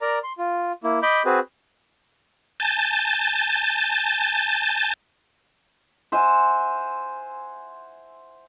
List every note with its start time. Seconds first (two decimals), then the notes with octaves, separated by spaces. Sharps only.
0.01 A#4 D5 A#5
0.24 C6
0.38 F4
0.84 A#3 E4
1.03 D#5 B5 D6 G6
1.25 C4 F#4 G#4 B4 C5
2.60 G#5 A5 G6 A6
6.12 C5 E5 F#5 G#5